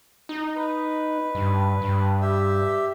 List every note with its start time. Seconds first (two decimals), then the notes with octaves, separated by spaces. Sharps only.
0.29 D#4
0.56 B4
1.35 G2
1.81 G2
2.21 G4 E5